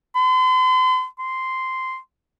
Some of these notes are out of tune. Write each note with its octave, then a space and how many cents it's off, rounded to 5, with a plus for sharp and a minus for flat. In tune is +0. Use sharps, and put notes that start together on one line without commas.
C6 -40
C6 -5